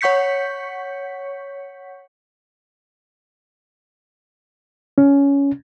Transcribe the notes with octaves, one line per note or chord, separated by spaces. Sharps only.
C#5 F#5 C#6 G6 B6 C#7
C#4